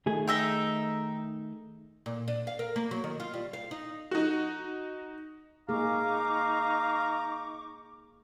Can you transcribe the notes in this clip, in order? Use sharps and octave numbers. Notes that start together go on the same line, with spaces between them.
D#3 A3 G#4
D#4 E5 G5
A#2
D4
F5
A#4
A#3
F#3
D#3
F4
G3
F5
D#4
D#4 F#4
A#3 D#4 G#4 F5 A#5 C#6 D6